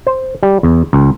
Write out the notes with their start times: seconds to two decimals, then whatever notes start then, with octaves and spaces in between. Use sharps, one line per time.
0.07 C5
0.43 G3
0.63 E2
0.93 C#2